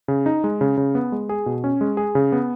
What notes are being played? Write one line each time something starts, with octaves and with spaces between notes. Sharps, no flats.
C#3
D#4
G#3
C#3
C#3
B3
G#3
G#4
B2
C#4
G#3
G#4
C#3
B3